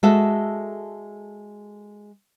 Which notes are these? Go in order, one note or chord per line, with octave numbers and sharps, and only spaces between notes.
G#3 F#4 A4 E5